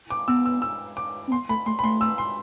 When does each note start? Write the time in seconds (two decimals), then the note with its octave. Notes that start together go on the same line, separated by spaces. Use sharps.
0.10 D6
0.28 B3 E6
0.45 E6
0.62 E6
0.97 D6
1.27 C4
1.31 B3 C6
1.49 A3 B5
1.66 A3 C6
1.79 B5
1.83 A3 C6
2.01 E6
2.18 C6